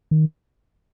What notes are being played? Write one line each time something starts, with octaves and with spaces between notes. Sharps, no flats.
D#3